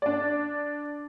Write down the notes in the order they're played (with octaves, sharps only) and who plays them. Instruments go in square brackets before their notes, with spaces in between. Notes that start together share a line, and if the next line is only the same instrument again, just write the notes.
[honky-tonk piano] D4 D5